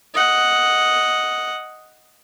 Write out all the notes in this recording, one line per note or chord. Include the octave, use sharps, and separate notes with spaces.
D#5 F#5